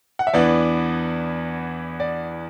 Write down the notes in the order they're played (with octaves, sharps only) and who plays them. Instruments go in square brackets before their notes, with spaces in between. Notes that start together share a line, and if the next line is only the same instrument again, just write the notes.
[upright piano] F#5
E5
[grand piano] E2 E3 B3 D4 [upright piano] D5
[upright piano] D5